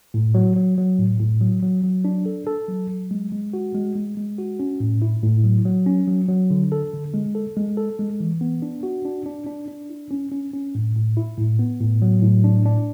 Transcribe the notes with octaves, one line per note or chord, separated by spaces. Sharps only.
A2
F#3
F#3
F#3
A2
A2
F#3
F#3
F#3
D4
A4
A4
F#3
F#3
G#3
G#3
F#4
G#3
G#3
G#3
F#4
C#4
A2
E4
A2
F#3
F#3
C#4
F#3
F#3
D3
A4
D3
G#3
A4
G#3
A4
G#3
E3
B3
D4
F#4
D4
D4
D4
D4
E4
C#4
C#4
C#4
A2
A2
E4
A2
B3
A2
F#3
A2
D4
D4